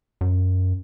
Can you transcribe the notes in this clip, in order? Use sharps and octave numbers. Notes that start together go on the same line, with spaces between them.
F#2